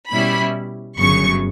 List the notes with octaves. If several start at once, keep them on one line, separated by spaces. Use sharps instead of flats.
B2 G3 C#4 E4 B5
G1 F#2 C#3 F#3 C#6